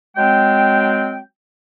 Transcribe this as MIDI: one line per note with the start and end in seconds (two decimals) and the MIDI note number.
0.17 1.18 54
0.17 1.18 56
0.17 1.18 60
0.17 1.18 79